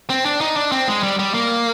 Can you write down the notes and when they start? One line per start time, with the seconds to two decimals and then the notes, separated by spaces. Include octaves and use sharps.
0.10 C4
0.25 D4
0.41 D#4
0.56 D4
0.72 C4
0.88 G#3
1.03 G3
1.19 G3
1.34 A#3